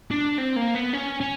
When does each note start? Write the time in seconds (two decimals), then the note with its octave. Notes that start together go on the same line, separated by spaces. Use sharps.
0.11 D4
0.38 C4
0.56 A#3
0.75 B3
0.93 C#4
1.21 C#4